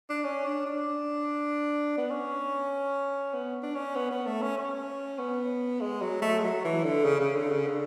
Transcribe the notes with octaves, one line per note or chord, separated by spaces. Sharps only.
D4
C#4
D4
D4
B3
C#4
B3
D4
C#4
B3
B3
A3
C#4
C#4
B3
G#3
F#3
A3
G#3
F#3
E3
D3
C#3
C#3
D3
C#3
D3